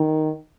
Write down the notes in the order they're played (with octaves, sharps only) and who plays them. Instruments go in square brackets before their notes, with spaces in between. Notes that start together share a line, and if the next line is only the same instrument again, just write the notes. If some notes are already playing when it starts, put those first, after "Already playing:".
Already playing: [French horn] D#3